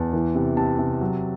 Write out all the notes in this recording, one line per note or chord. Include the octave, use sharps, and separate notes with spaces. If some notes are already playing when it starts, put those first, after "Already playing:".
Already playing: E2 A5
E3
C3
C3 A5
C3
F#3